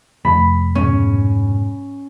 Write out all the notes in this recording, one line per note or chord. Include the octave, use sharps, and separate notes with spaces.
F1 B5
G#2 B2 C#4